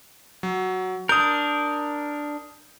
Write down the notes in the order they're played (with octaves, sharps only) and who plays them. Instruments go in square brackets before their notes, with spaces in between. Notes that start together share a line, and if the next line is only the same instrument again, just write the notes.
[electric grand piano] F#3
[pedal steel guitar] D4 A#4 [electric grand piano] D#6 G6